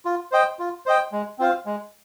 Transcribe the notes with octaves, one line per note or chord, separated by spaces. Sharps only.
F4
C5 D#5 G5
F4
C5 D#5 G5
G#3
C4 F4 C5 F5
G#3